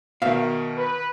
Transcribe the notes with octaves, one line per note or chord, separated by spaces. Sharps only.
B2 D#3 E5 F5
B4